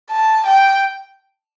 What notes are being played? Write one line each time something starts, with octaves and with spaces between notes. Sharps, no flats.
A5
G5